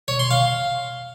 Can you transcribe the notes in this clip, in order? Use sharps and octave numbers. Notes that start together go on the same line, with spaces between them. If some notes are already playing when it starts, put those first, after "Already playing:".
C#5
C6
F5